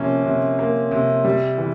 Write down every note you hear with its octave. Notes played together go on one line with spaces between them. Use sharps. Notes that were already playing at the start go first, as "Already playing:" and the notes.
Already playing: C3 F3 A#3 C#4
C3
A#3
C3
G3
E3